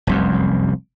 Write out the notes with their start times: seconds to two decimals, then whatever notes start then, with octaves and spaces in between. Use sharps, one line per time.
0.07 F1 C2 F#2